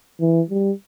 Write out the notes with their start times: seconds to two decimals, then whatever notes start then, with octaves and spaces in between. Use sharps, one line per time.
0.20 E3
0.50 G3